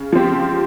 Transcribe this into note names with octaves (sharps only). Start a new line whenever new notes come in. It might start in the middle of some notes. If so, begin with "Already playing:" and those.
Already playing: C#3
F3 C4 G4